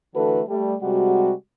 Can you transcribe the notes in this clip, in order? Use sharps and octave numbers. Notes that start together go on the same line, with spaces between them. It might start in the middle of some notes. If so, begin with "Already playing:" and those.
D3 E3 A3 F#4 A4 B4
G3 A3
C3 G3 G#3 F#4